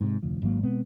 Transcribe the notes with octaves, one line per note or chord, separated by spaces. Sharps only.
G#2 C3
F1 D2 F3
G#1 G#2 F#3 A#3
B2 G#3 B3 C4